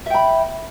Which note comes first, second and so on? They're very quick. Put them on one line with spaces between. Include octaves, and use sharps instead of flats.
E5 G5 B5